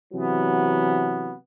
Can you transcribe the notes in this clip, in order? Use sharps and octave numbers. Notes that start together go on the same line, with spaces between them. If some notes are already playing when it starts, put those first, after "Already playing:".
C3 E3 F#3 B3